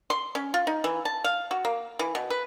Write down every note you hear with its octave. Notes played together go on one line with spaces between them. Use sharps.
C6
C#4
F4
D#4
E3
A5
F5
F#4
A#3
E3
B2
B4